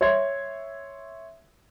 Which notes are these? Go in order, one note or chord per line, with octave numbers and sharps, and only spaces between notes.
C#5 E5 C6 G#6